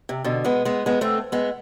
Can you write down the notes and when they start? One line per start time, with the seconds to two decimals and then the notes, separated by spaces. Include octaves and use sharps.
0.09 C3
0.24 B2 D3
0.45 G#3 B3
0.65 G#3 B3
0.86 G#3 B3
1.01 A3 C4
1.32 G#3 B3